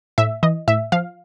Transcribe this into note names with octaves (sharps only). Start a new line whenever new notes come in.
A2 E5
E3 D#5
A2 E5
F3 F5